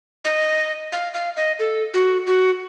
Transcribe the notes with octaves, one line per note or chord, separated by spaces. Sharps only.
D#5
F5
F5
D#5
A4
F#4
F#4